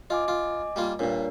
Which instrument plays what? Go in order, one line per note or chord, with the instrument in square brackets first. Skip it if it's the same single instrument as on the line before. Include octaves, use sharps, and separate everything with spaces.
[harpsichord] F4 [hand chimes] D#5 G#5 D6
[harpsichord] F4
G3 A#3 F4
[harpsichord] G2 A#2 [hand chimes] D4 A#4 C#5